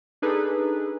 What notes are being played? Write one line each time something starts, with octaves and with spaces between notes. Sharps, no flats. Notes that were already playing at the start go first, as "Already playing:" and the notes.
D4 D#4 G#4 A4 B4